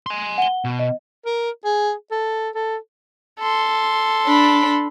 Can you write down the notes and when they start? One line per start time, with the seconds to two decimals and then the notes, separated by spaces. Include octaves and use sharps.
0.06 G#5 C6
0.38 F#5 G7
0.64 B2
0.79 D#5
1.25 A#4
1.64 G#4
2.11 A4
2.55 A4
3.39 A4 C6
4.26 D4 B5